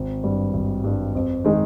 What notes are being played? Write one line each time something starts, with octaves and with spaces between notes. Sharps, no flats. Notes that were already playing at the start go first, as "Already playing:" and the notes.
Already playing: G#1
G2 G3
G#1
G2 G3
F2
D#3 G#3 D#4